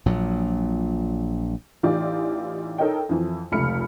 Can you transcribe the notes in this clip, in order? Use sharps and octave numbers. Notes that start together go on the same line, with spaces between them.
A#1 A#2 F#3
A1 E3 D#4 F4 G4 D5
D#4 A4 A#4 C#5 D#5 G5
F2 E3
F1 C#2 A3 B5 F6 C#7